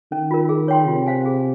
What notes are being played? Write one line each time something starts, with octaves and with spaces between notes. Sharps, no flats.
D#3 C#4
F4 A#4
G#4
C#5 G5 C6
C3 F4
C5 F5 G#5
G#4